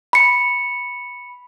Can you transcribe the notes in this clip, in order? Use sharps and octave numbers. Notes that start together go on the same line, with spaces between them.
B5 C#7